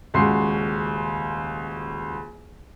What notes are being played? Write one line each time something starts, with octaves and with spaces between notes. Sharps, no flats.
D#1 C#2 F#4 C6 C7